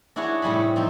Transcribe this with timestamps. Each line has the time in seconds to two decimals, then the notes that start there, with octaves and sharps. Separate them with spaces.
0.16 D4 E4 F#4 G#4 C#5
0.42 A2 C3 G3 G#4 B5
0.76 F3 C4 D#4